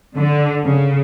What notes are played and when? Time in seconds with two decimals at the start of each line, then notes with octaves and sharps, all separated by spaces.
0.16 D3
0.63 C#3